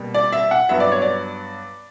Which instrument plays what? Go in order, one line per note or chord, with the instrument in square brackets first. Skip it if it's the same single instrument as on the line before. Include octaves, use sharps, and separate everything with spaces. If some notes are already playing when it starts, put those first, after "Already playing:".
Already playing: [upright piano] B2 G3 A#3
D5
E5
F#5
G2 F#3 B3 E5
D5
C#5
D5